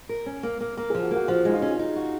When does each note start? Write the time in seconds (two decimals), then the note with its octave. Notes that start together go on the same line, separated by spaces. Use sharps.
0.09 A#4
0.26 C#4
0.43 A#3
0.60 A#3
0.77 A#3 A#4
0.90 G#4
0.95 F3
1.03 F#4
1.11 A#3
1.16 F#4
1.28 F3 F#4
1.45 G#3 D#4
1.54 F4
1.62 C#4
1.79 D#4
1.96 F#4